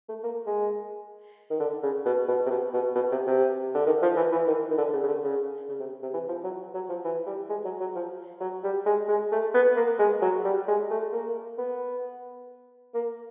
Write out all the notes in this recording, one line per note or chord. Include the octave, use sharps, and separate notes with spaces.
A3
A#3
G#3
D#3
D3
C#3
B2
B2
C3
B2
B2
B2
C3
C3
D3
D#3
F3
E3
E3
D#3
D#3
D3
C#3
C#3
D3
C#3
C#3
C3
C3
E3
F3
F#3
F#3
F3
E3
G3
G#3
F#3
F#3
F3
F#3
G3
G#3
G#3
A3
B3
A#3
G#3
F#3
G3
G#3
A3
A#3
B3
A#3